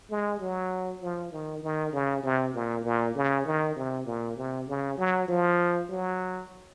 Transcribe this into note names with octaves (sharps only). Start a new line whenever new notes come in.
G#3
F#3
F3
D#3
D#3
C#3
C3
A#2
A#2
C#3
D#3
C3
A#2
C3
C#3
F#3
F3
F#3